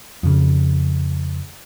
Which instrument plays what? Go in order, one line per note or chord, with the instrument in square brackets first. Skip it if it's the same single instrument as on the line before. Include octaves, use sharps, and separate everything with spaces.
[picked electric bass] F2 C#3